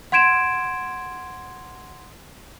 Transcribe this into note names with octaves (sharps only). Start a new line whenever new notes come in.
F#5 C6 G#6 D7 E7